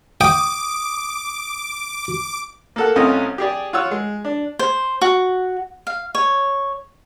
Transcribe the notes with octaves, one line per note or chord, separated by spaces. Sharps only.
G5 D6 D#6
A#3 A4 F#5
C2 A3 C4 C#4 F4 D#5
G4 G#4 D5
F4 C#5 F#5 E6
G#3
D4
C5
F#4
F5
C#5